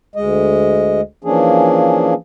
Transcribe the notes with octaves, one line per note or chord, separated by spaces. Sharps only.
D2 G#3 D#5
E3 F3 A#3 C#4 D4 G#4